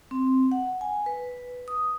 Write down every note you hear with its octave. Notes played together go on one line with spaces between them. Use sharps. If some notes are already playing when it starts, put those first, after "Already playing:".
C4
F#5
G#5
B4
D#6